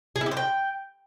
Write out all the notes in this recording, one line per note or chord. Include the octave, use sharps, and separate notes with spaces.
G#4
E4
G4
C5
G5